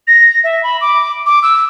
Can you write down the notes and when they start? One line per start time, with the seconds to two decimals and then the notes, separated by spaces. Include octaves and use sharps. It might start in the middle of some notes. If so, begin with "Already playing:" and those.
0.07 A#6
0.44 E5
0.63 B5
0.81 D6
1.26 D6
1.43 E6